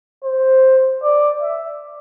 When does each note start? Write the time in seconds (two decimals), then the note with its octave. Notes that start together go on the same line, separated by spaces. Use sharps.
0.24 C5
1.03 D5
1.42 E5